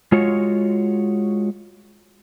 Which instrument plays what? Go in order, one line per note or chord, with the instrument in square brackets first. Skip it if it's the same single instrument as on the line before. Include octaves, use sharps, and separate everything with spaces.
[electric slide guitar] G#3 F4 F#4 C#5